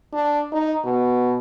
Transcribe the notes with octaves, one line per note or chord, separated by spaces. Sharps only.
D4
D#4
B2